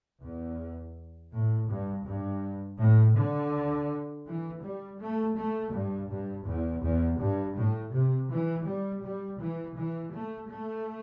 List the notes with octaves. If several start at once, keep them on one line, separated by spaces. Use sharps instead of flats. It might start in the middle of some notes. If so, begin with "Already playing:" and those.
E2
A2
G2
G2
A2
D3
E3
G3
A3
A3
G2
G2
E2
E2
G2
A2
C3
E3
G3
G3
E3
E3
A3
A3